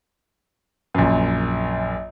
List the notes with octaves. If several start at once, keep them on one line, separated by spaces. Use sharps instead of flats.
A#1 F#2